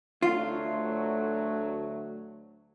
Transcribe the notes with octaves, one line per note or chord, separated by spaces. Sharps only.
D2 F#3 A3 F4